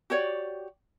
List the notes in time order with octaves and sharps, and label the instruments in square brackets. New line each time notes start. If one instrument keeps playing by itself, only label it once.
[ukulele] F#4 G4 C#5 D5